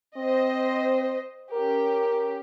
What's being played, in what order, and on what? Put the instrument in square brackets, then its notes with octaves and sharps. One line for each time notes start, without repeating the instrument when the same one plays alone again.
[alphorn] C4 [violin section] C5 D#5
[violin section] C#4 G4 [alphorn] A#4